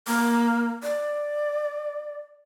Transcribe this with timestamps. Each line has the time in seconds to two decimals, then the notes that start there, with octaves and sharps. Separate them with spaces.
0.07 A#3
0.83 D5